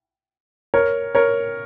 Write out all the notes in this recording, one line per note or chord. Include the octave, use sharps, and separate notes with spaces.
A#4 C#5
A#4 C#5